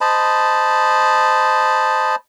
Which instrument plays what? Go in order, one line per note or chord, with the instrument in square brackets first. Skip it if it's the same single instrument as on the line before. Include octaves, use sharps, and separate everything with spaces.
[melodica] C5 D#5 A5 B5